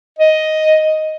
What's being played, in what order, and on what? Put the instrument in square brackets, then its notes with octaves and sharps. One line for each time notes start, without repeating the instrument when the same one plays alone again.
[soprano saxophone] D#5